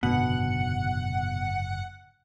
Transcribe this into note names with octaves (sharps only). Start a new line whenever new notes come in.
F#1 G#2 B2 D3 F#5